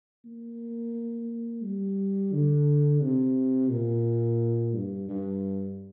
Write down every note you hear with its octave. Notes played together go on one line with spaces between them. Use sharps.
A#3
G3
D3
C3
A#2
G2
G2